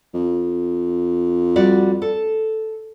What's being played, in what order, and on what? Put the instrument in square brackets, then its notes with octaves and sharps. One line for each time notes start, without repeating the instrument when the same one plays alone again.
[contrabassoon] F2
[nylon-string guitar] G3 F#4 D5
A4